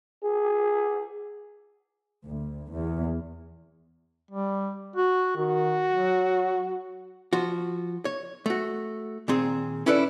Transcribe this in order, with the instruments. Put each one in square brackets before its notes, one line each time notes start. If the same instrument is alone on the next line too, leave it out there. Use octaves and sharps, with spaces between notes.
[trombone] G#4
[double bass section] D2
E2
[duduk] G3
F#4
[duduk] D#3 [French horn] F#4
[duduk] F#3
[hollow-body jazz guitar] F3 F#4
C#5
A3 F#4
A#2 D#3 C4 G#4
C#4 E4 A4 B4 D5